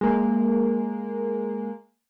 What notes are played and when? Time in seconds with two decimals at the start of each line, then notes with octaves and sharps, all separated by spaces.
0.01 G#3 A#3